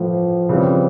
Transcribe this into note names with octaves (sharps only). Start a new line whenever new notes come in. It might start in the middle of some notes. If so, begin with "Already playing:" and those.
Already playing: A2 E3 F3 A3
C#3 E3 G3 C4